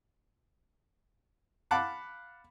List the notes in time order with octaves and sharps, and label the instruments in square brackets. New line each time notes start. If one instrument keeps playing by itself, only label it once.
[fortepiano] F5 F#5 A5 B5 D6